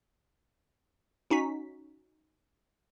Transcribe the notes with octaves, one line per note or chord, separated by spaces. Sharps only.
C#4 D#4 F#4 B6